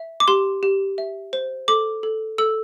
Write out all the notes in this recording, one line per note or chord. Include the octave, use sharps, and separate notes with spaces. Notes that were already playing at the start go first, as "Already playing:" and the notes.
Already playing: E5
D6
G4 C6
G4
E5
C5
A4 D6
A4
A4 E6